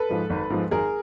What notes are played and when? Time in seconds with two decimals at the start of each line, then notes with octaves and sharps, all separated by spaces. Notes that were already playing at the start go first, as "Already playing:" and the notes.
Already playing: A4 B4
0.09 G#2 F3 G#3
0.30 G#1
0.50 G#2 F3 G#3
0.71 G#1 G#4 A#4